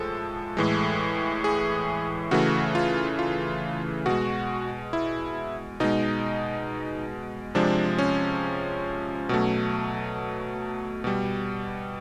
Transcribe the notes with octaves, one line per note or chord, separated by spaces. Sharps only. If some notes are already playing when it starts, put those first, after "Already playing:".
Already playing: A2 F3 G#3 A4
A2 E3 G#3
G#4
C#3 E3 A3 F#4
F4
F4
B2 G#3 F#4
E4
B2 G#3 D#4
C3 F3 G#3 D4
C#4
B2 F#3 A3
B2 G3